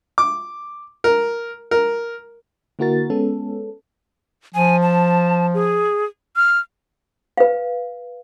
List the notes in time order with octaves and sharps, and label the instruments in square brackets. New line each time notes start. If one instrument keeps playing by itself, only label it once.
[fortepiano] D6
A#4
A#4
[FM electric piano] D3 A#3 E4 F#4 A#4 A6
G#3 B3 C#4 A4
[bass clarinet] F3 [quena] G#5
[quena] A5
G#4
F6
[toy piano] B4 F5